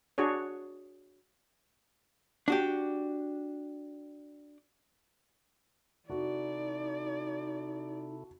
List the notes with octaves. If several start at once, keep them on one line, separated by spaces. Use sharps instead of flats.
D4 F#4 G#4 C#5
D4 F#4 G4
C3 D#4 E4 F#4 A4 D5